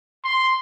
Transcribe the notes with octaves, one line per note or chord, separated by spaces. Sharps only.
C6